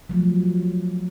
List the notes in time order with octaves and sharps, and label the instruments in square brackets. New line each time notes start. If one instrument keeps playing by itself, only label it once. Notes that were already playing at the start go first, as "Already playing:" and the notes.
[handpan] F3 F#3 A3